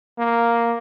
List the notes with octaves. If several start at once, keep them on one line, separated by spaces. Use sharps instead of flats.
A#3